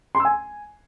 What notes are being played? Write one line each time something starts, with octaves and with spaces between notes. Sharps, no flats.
C6
E6
G#5